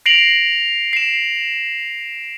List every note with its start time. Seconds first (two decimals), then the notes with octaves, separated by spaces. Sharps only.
0.06 A#6 C7 D7 F7 F#7
0.93 C7 E7